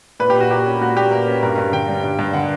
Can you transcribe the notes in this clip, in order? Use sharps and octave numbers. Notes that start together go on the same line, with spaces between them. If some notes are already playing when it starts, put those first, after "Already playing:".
A#2 B4
G4
A#2 F#4
A#3 G4
C#4
A#2 F#4
A#2 G4
A#3 A#4
C#4
G2 A#4
G2
D3 G5
G3
G2
G2
D3 F#5